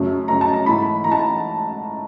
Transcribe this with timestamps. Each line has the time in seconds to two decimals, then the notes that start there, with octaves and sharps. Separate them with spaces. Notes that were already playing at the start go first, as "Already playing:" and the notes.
Already playing: F#2 C#3 F#3 A3
0.28 F#2 C#3 F#3 A3 A#5
0.41 A5
0.53 A#5
0.66 G#2 E3 A3 B5
1.04 E3 A3 A#5
1.12 A5